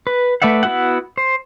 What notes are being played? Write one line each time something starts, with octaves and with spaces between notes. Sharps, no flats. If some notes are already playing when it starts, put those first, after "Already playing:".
B4
A3 B4 D5 E5 F#5
B3 E4 F#4 E5 F#5
C5